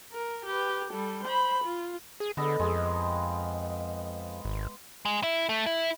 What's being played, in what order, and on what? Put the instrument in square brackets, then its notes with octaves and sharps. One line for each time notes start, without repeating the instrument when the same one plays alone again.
[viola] A#4
G4 B4
G3 A4
C5 B5
F4
[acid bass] G#4
[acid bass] D3 [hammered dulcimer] B3 A4 D#5
[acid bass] F2 [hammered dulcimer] G#3
[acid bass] G#1
[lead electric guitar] G#3
E4
A3
E4